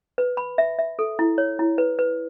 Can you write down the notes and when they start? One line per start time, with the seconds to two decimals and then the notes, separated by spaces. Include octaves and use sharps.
0.18 B4
0.37 B5
0.58 E5
0.79 E5
0.99 A4
1.19 E4
1.38 C#5
1.59 E4
1.78 B4
1.99 B4